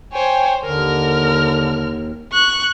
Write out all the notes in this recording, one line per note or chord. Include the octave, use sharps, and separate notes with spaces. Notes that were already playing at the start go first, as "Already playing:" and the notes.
C5 C#5 G5 G#5
D#2 D3 A#4 F6
C#6 F#6